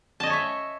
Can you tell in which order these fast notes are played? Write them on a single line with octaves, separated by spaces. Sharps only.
A5 D#5 G#5 C#5 E5